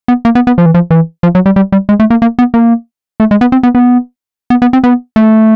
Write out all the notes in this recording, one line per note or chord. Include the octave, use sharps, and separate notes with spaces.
B3
A#3
B3
B3
F3
E3
F3
E3
F3
F#3
G3
G3
G3
G#3
A3
A#3
A#3
B3
A#3
A3
G#3
B3
C4
B3
B3
B3
B3
C4
B3
A3